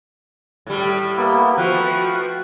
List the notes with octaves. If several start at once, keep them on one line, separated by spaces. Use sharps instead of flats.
A2 G3
A#3 B3 E4
F3 A3 F#4 B4 G5